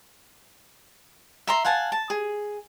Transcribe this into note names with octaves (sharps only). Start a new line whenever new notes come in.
E5 A#5 C6
F5 F#5 G#5 A5
A5
G#4